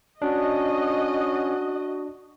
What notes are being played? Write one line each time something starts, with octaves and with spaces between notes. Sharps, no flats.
C#4 D4 F#4 D#5